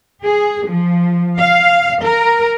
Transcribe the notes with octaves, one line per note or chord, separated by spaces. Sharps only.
G#4
F3
F5
A#4